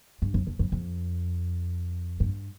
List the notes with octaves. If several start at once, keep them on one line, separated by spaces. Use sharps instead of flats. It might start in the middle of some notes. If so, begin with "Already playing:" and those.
G2
F2
E2
F2
F2
G2